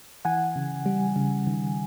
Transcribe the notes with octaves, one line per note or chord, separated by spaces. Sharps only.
E3 F#5 G#5
C#3
G3
C#3
D#3